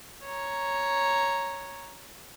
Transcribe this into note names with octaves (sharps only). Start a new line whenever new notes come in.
C#5 A#5